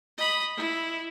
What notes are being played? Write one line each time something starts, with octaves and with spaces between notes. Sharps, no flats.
D#5 B5
E4